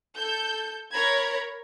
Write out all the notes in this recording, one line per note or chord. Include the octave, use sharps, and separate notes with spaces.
A4 G6
A#4 C#5 A#5 B5 G#6